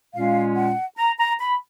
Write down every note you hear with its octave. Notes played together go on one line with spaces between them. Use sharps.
A#2 G#3 C#4 F4 F5
F#5
A#5
A#5
B5